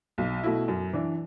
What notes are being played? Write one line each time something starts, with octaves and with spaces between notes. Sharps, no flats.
B1
B2 A3 E4
F#2
E3 D4